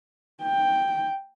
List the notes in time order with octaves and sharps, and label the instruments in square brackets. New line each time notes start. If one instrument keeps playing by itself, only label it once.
[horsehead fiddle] G5